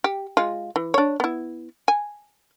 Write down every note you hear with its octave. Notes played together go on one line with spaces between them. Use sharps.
G4
G#3 F4
E3
D4 C#5
B3 E4
G#5